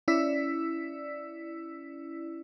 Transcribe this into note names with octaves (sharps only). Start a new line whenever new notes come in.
C#4 E4 D5 E6 B6